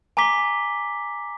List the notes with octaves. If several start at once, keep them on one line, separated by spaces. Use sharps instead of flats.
G#5 A#5 D6 B6 G7